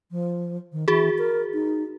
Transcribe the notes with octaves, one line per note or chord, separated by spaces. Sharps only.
F3
D#3
E3 F#4 G#4
A#4
D#4